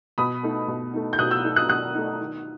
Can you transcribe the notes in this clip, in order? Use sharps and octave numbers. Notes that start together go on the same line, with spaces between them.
B2 B5 D#6
A3 D#4
B2
A3 D#4
G6
B2 D#6 F#6
E6 G6
A3 D#4
D#6 F#6
B2 D#6 F#6
A3 D#4
D#3